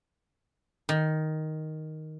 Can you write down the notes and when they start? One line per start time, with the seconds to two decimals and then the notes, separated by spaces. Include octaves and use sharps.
0.89 D#3